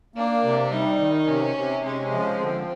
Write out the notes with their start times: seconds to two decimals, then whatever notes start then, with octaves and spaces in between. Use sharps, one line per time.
0.16 A#3 D4
0.44 C3
0.72 G3 D#4
1.00 D#3
1.27 C3 C#4
1.55 C3
1.83 G#3 C#4
2.12 F3
2.39 D3 C4